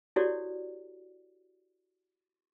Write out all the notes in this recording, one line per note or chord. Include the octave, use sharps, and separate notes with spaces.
E4 F#4 G4 A4 C#5 D5